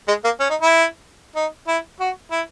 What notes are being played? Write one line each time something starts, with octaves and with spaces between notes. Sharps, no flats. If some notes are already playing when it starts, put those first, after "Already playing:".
G#3
A#3
C#4
D#4
E4
D#4
E4
F#4
E4